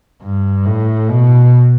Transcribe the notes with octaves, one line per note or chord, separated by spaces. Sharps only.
G2
A2
B2